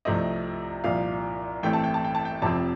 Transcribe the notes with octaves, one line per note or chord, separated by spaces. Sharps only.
C2 C3 F3 A3 C4 D#5
C2 A#2 F3 F5
A1 A2 A3 C4 G5
A5
G5
A5
G5
A5
G5
F1 F2 C3 F3 C4 A5